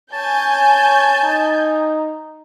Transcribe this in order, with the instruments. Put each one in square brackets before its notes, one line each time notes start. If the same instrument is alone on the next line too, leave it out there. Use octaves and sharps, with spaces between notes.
[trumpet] C#5 [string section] G#5 G6 [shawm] A5
[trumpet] D#4